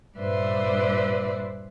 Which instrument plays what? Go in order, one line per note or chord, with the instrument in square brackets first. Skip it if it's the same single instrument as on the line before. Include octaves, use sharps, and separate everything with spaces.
[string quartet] G2 A#2 B4 C5 D5 E5